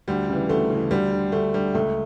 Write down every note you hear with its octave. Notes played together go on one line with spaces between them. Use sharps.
D2 G3
C#3 E3
D2 A3
C#3 E3
D2 G3
D3
D2 A3
D3 G3
C#2 A3